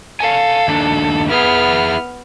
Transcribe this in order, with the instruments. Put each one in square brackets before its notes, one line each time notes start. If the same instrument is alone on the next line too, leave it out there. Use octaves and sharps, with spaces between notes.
[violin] A4 [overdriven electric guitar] F5 G#5
[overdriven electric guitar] D#2 D4
[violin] B3 F6 [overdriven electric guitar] E4 G#4